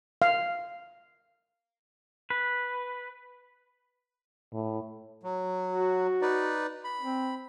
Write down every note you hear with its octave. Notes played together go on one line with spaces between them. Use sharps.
F5
B4
A2
F#3
F#4
D#4 B4 D5
B5
C4